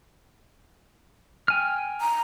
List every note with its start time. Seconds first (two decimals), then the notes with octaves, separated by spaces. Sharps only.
1.48 G5 G#5 F6
2.01 A#5